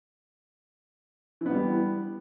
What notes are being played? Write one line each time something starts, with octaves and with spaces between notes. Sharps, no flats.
E3 G3 B3